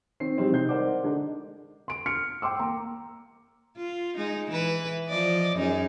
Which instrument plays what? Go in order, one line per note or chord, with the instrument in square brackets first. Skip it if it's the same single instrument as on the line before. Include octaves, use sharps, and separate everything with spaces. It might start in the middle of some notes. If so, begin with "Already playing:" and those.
[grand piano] D#3 C4 C7
E3 G3 G#3 C4 D#4
C3 D#3 D#5 G6 C7
A#4 C5 D5 F#5 D6
D3 G#3 D4 D#4
[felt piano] C6 D7
F6 C#7 D7
G5 C6 D6 E6
A#3 A#5
[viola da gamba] F4
G#3 D#4
E3 E4 B4
F3 D5 D#5
F#2 D#4 G#4